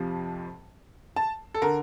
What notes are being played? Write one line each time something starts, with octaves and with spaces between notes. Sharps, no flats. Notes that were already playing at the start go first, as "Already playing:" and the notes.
Already playing: F2 C3 F3
A5
A4
D3 A#4